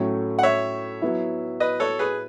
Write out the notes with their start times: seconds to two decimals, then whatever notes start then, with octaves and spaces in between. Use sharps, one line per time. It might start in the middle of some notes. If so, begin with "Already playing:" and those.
Already playing: A2 F#3 A3 C#4
0.39 F#5
0.43 C#5 E5
1.02 F#3 B3 E4
1.60 B4 D#5
1.80 A4 C#5
1.99 G#4 B4